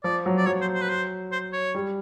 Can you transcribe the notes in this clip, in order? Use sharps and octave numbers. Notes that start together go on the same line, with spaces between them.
F3 D5
F#3
D5
F#3 C#5
C5
C5
B4
C5
C5
C#5
G3